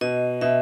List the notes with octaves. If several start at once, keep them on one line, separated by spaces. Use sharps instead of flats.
B2 D#5
B2 E5